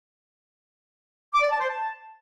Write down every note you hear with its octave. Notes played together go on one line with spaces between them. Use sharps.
D6
D5
A5
C5
A5